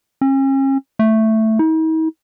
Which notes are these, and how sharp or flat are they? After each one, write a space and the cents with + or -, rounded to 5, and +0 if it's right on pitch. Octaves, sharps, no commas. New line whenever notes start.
C#4 -40
A3 +5
D#4 +45